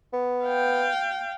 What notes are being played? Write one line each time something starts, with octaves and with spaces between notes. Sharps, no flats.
B3
F5 G5